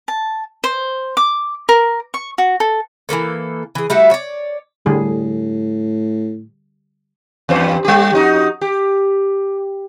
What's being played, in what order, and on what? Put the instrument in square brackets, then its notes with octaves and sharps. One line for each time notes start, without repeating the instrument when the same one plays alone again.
[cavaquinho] A5
C5
D6
A#4
C#6
F#4
A4
[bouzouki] E3 G#3 A#3 A4
E3 G#4
G3 A3 E4 F#4
C#5 D5
[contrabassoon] A2 [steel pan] D3 G3 G#4
[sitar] E2 G2 C5
G3 G4
F2 D#4 F#4
G4